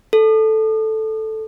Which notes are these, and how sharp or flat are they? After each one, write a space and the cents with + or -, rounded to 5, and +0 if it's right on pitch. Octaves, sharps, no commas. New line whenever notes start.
A4 -5